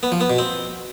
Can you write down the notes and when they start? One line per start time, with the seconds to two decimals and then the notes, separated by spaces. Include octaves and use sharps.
0.03 B3
0.12 F3
0.21 B3
0.30 B2
0.38 C4